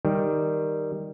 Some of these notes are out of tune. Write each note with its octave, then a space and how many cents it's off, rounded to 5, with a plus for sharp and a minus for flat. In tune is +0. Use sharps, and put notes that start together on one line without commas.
D#3 +0 G3 +0